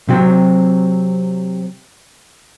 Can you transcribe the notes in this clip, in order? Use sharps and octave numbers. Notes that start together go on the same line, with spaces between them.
C3 F#3 C4